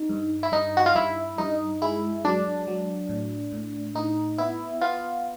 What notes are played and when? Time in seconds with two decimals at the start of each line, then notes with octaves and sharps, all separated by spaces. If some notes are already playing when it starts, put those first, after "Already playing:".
Already playing: D#4
0.09 G2
0.43 E4
0.52 G2 D#4
0.77 F#4
0.86 F4
0.95 G2 E4
1.38 G2 D#4
1.82 G#3 E4
2.25 F#3 D4
2.67 F#3
3.09 A2
3.52 A2
3.95 A2 D#4
4.38 B3 E4
4.81 B3 F4